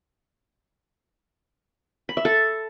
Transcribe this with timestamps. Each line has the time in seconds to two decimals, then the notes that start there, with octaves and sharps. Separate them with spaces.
2.09 B5
2.17 E5
2.25 A4